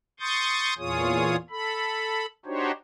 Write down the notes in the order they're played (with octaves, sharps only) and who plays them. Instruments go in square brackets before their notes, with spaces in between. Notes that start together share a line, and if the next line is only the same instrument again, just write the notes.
[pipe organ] C6 C#6 D#6 G6 A6
E2 A#2 F4 G#4 C#5 D#6
A4 B5
D4 D#4 F#4 G4 C5 C#5